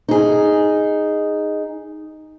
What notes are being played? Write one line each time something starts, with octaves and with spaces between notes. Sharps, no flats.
D#4 G#4